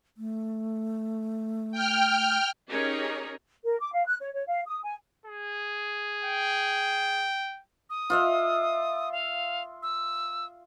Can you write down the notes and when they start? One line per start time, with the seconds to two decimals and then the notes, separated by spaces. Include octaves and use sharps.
0.17 A3
1.72 G5 F6
2.69 C#4 D#4 G4 G#4 A#4 C#5
3.64 A#4
3.80 D6
3.93 F5
4.06 F#6
4.20 C#5
4.33 C#5
4.47 F5
4.66 D#6
4.83 G#5
5.26 G#4
6.24 G5
7.90 D#6
8.10 F4 D#5 E5
9.12 F5
9.83 E6